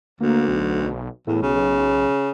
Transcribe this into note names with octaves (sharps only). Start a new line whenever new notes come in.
D2 A#3
B1
E2 A2
B1 C#3